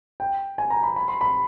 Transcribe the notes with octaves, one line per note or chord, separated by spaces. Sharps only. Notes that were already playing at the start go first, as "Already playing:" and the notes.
G5
G#5
A#5
B5
B5
C6
B5